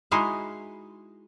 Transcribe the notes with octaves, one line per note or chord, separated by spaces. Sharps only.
G#3 D#4 E4 F#4 F5